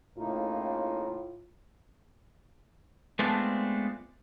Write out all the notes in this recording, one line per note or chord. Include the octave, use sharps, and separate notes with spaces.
A2 C#3 A#3 D#4 F4
G#3 A3 B3 C4 D4 F4